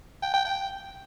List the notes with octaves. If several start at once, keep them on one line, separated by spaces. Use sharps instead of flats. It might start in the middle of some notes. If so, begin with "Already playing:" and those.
G5
G5
G5